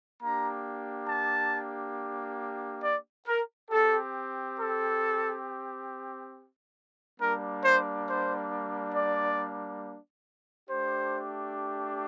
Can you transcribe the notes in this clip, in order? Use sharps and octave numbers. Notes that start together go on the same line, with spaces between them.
A#3 D4 G4 A#5
A5
D5
A#4
C4 G4 A4
A4
G3 A#3 D4 A#4
C5
C5
D5
A3 D4 G4 C5